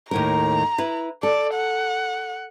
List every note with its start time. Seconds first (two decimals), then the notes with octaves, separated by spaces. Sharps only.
0.11 D#2 A2 A#4 A#5
0.78 E4 B4
1.23 A4 D5
1.54 F#5